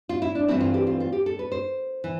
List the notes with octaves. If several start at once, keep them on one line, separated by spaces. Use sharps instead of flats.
F4
E4
D4
G2 E3 A3 C4 E4
F4
G4
F4
F4
G4
A4
B4
C5
E3